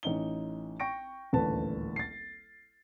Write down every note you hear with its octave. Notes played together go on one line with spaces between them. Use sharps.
A1 D#4 G7
G5 C#6 A#6 D7
D#1 A1 D2 B4 A5
A6 C7